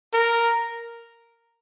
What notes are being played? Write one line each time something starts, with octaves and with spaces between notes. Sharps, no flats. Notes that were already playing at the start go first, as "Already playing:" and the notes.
A#4